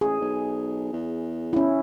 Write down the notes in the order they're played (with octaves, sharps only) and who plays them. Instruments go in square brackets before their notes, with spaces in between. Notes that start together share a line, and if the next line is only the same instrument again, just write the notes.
[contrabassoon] A1 [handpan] G#4
[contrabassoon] B1
E2
[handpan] C#4 E4